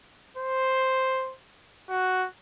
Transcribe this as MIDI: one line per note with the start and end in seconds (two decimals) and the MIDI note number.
0.37 1.33 72
1.90 2.26 66